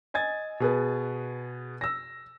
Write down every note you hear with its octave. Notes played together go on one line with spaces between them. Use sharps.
D#5 G#5 G#6 A6
B2 G#4 B4
E6 A#6